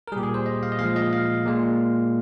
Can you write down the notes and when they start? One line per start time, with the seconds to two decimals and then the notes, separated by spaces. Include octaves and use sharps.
0.08 A#4
0.12 G3 G#4
0.16 A#2 G4
0.23 G#4
0.34 C5
0.46 D#5
0.63 F5
0.72 D#5
0.78 A#2 F3 G#3 F5
0.96 D#5
1.13 F5
1.46 A#2 G#3